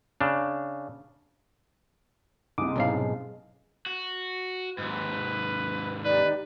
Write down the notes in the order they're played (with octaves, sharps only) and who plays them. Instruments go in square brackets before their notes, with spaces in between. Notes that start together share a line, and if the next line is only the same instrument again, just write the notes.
[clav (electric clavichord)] C#3 D4
[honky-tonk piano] C2 C3 [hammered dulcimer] G#3 [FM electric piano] D6 D#6
[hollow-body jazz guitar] B1 G#2 F5 [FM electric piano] B2 C#4
[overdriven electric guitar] F#4
[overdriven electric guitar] D#2 G#2 [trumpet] B4
[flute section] D#4 G4 D5 [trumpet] B4